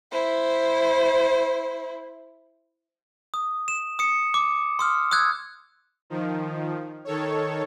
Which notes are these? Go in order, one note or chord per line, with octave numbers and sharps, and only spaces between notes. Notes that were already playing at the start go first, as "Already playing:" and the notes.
E4 C5
D#6
E7
D#6 C#7
D6
C6 D#6 F6
D#6 E6 F#6 G#6
D#3 F3
D#3 A4 C#5